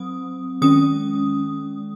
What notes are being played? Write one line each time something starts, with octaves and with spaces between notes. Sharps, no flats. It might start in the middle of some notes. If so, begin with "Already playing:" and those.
Already playing: F#3 C4 D#6
D#3 G#3 C#4 D#6